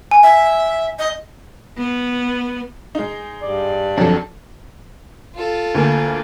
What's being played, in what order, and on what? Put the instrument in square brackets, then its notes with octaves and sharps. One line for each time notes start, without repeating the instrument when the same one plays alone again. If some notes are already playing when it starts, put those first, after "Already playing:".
[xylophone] G#5
[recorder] E5
D#5
[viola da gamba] B3
[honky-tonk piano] G#3 D#4
[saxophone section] G2 D5
[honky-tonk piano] F2 F3 F#3 [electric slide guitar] D4 A4
[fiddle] F4 A4
[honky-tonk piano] D2 A#3 G#5